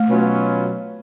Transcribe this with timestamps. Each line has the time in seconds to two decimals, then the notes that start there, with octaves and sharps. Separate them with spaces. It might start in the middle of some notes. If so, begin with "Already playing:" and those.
Already playing: A3
0.09 B2 F#3 C#4 F4 B4